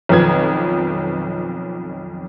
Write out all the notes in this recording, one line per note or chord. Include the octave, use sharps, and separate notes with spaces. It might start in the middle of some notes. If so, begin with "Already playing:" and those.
B1 F2 D#3 F3 B4 G#6